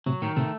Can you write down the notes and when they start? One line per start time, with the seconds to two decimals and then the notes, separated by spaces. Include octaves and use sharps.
0.06 A2 C3 F#3
0.22 A2 D#3
0.36 A2 C3 A3